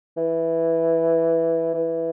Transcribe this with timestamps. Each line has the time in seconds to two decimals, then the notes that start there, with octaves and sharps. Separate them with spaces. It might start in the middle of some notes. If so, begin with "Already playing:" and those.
0.17 E3
1.74 E3